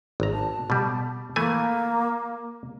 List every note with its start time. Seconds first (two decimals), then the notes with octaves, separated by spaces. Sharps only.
0.20 G#1 A#5
0.34 A5
0.70 B2 G3
1.36 E3 A3 A#3 G#5